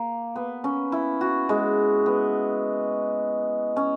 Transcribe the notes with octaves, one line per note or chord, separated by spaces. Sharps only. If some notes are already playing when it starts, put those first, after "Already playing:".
Already playing: A#3
B3
C#4
E4
F#4
G#3
B3
C#4